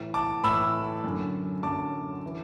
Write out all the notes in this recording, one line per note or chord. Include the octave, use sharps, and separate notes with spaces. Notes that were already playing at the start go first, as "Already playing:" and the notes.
Already playing: A2 E3
A5 D6
A2 E3 B5 E6
F#2 D3
F#2 D3 A5 D6
E3